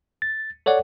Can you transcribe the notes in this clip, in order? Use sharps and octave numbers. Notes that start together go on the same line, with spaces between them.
A6
A4 C#5 D5 F#5